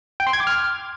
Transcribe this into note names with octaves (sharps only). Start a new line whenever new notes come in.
G5
C6
G#6
D6
F6